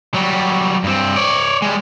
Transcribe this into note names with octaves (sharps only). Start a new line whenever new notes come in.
F#3 G3
G2 C4
C#5 D5
G3 G#3